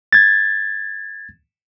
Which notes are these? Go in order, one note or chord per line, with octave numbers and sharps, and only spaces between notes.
G#6 A6